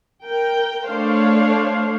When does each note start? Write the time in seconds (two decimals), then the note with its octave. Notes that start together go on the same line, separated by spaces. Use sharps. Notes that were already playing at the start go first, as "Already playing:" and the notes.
0.24 A#4 G5
0.88 A3 D4 C5 C#5 F5